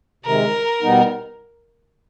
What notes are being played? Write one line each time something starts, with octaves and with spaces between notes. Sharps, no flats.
C3 D#3 G#3 A#4
B2 G3 B3 D#4